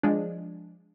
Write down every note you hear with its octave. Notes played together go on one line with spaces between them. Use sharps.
F3 G#3 D4